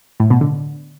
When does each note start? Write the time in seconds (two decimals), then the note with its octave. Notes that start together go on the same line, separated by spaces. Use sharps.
0.20 A2
0.30 B2
0.41 D3